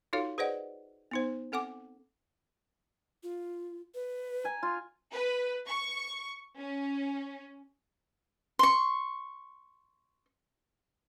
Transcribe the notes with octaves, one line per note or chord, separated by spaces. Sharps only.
D#4 F4 F#4 A4 C#5 F5
G#4 B4 C5 D5 D#5 F#5
B3 D#4 C5
C4 A4 F#5 G#5 D6
F4
B4
G#5 A#5
F4
B4
C#6
C#4
C6 C#6